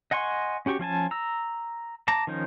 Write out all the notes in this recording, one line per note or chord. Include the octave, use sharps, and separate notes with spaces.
D#5 F#5 G#5 C6 C#6
C#4 F#4 G4 C#6
F3 C#4 G#5 A5
A#5 E6
A5 A#5 D6
D#3 F3 C#4 D#4